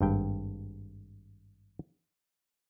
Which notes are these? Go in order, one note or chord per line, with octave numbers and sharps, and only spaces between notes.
G#1 G2 G5